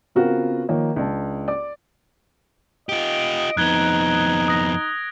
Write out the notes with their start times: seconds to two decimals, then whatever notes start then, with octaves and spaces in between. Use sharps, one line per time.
0.15 C#3 B3 C4 F4 F#4 A#4
0.69 D#3 F3 A#3 C#5
0.96 C#2 D4 A5
1.48 D5 D6
2.89 F4 G4 D#5 D7
3.57 F2 B3 D#4 F#6 G#6 G7
4.48 D#6 A#6